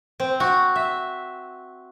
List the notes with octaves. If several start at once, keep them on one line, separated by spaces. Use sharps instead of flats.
C4
F#4
E5